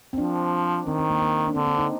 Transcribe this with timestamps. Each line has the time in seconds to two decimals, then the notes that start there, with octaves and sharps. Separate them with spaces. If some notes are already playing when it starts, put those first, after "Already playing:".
0.13 C4
0.18 F3 D4
0.86 D#3 C4
0.98 C4
1.09 A#3
1.21 A#3
1.46 D4
1.55 D3 C4
1.67 C4
1.78 D#4